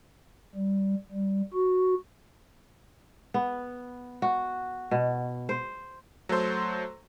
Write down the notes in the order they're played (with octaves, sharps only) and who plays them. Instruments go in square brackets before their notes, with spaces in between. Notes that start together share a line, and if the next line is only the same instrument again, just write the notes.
[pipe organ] G3
G3
F#4
[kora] B3
F#4
B2
C5
[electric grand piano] F#3 A3 A4 C5 C6